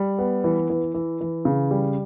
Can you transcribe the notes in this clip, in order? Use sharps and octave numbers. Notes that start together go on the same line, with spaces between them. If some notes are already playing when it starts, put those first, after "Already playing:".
Already playing: G3
B3
E3
E3
E3
E3
C#3
G3